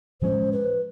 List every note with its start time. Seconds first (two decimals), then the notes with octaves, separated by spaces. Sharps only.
0.21 A2 F3 G#3 C#4 C5
0.52 B4